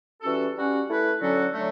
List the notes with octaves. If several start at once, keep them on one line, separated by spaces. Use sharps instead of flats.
E3 G3 C#4 F#4 A4
G3 C#4 F#4
A3 E4 B4
D3 F#3 C#4 F#4 A4
D3 F#3 A3